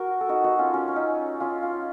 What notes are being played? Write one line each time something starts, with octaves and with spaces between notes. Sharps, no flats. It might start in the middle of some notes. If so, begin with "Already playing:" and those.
Already playing: F#4 A#4
A4
D#4 F#4
D#4 F#4
C#4 F4
C#4
C#4
D#4
C#4 F4
C#4 F4